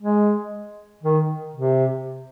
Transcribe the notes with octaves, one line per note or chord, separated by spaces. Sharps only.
G#3
D#3
C3